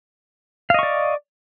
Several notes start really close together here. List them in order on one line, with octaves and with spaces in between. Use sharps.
F5 D#5 C#6 D5